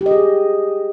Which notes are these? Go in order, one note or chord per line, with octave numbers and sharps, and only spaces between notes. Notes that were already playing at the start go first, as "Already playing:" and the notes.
G4
D#5
G#4